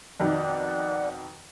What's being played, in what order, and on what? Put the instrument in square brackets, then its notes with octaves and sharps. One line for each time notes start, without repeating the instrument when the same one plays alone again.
[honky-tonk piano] F2 B2 D#3 [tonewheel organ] D5 F#5